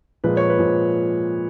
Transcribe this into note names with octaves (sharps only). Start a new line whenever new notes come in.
A#2 F3 G#3 B4
C#5
B4
A#2 F3 G#3